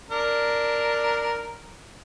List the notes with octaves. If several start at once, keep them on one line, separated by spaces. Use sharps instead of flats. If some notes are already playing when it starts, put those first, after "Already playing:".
D4 A#4